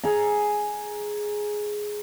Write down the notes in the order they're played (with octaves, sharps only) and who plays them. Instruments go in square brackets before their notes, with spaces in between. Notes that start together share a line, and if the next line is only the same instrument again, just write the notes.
[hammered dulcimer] G#4 A#5